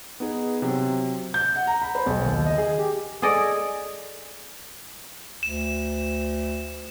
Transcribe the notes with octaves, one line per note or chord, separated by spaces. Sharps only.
B3 D#4 G#4
C3 F#3
G6
F#5
A#5
B5
C5
B1
D#2
D#5
G#4
G4
G#4 A4 D5 D#5
D2 E7